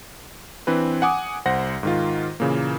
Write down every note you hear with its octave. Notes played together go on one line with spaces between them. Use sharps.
E3 C4 D4 B4
F#5 G#5 D6 D#6
C2 C5 F#5 A#6
G#2 D#3 F4
A#2 C#3 E3 A#3